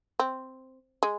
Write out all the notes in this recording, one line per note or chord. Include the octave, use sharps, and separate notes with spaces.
C4
G#3